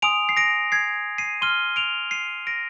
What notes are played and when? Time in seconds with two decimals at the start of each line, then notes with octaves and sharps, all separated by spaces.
0.02 G#5 C6 D#6 D7 F7
0.29 C7
0.37 A#6 D7
0.72 G#6 C7
1.18 C7 D#7
1.42 C6 F6 D#7 G7
1.76 D7 F7
2.11 C7 D#7
2.47 A#6 D7